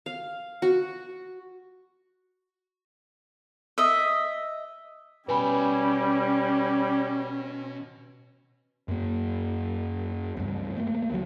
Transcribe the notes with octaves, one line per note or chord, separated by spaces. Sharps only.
F5
F#4
D#5 E5
B2 G3 C#4 B4 G#5 B5 C6
F#2 A#3
C#2 G2
A3 A#3
C#2 F#3